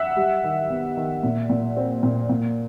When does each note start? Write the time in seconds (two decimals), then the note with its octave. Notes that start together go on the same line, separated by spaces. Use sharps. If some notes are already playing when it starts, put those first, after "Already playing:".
Already playing: E5 F#5
0.16 G3
0.43 D#3
0.70 B3
0.97 D#3
1.23 A#2
1.50 A#2
1.77 C4
2.03 A#2
2.29 A#2